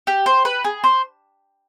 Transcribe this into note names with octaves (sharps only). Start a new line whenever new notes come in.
G4
C5
B4
G#4
C5